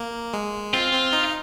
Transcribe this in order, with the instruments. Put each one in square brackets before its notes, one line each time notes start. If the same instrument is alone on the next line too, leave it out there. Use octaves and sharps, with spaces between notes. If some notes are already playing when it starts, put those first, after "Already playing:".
Already playing: [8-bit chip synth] A#3
G#3
[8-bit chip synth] C4 [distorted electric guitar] F4
[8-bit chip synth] C4
D#4